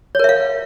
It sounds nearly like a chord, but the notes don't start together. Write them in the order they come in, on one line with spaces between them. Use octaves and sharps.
C#5 A#4 E5 F5